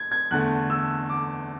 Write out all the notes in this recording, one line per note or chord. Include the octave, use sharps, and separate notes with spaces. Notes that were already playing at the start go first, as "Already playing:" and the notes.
Already playing: G#6
G#6
E2 D3 A3 F#6
E6
D6